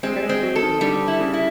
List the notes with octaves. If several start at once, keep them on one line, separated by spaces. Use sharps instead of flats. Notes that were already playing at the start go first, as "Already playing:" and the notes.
G#3 C4
G3
G#3
C4
F#3
A4
D#3
D3 G3
E4
C#3
E4